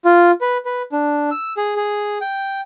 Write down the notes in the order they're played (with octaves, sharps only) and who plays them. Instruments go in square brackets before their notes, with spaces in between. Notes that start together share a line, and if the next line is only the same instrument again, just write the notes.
[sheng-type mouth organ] F4
B4
B4
D4
E6
G#4
G#4
G5